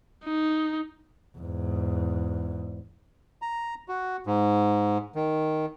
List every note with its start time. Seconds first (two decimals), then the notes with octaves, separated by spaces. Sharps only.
0.25 D#4
1.38 E2 G#2
3.42 A#5
3.88 F#4
4.27 G#2
5.15 D#3